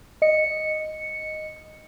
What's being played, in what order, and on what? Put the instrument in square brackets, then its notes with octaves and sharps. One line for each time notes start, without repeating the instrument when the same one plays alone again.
[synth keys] D#5 C#7